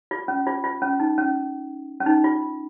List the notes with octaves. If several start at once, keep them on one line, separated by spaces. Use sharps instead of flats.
F4
C#4
F4
F4
C#4
D#4
C#4
C#4
D#4
F4